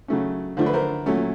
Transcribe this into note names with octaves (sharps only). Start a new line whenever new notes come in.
C#3 F#3 A3 C#4
D3 F3 A3 D4 C5
B4
A#4 C5
A#2 F#3 A3 C#4